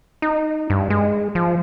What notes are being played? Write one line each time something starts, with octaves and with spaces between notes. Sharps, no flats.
D#4
G2
G#3
F3